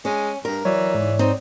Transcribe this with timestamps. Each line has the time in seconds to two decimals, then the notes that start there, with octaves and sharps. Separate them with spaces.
0.05 G#3 C#4
0.45 G2 A#4
0.65 E3 F#3 C#5 D5
0.95 G#2
1.19 C4 D#4